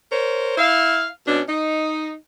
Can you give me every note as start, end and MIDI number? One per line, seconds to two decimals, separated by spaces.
0.11 0.57 70
0.11 0.57 72
0.11 0.57 73
0.58 1.08 64
0.58 1.08 77
1.27 1.41 47
1.27 1.41 61
1.27 1.41 62
1.48 2.13 63